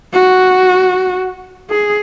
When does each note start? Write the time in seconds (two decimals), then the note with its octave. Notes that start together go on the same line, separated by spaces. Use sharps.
0.13 F#4
1.70 G#4